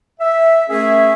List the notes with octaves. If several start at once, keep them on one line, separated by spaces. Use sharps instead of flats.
E5
A3 C#4 G#4 A#4 E5